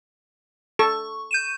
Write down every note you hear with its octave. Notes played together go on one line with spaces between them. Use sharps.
A4 C#6
G6 D#7 E7